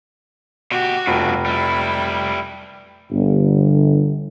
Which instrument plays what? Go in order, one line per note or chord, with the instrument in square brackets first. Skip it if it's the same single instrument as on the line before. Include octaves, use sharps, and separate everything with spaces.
[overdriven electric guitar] B2 G4 [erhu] F#4
[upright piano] F1 [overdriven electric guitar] G2 B2
[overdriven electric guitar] G3 E4 [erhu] B5
[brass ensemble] G1